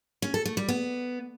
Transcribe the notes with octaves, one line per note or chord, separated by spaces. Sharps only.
C#4
A4
A3
G3
B3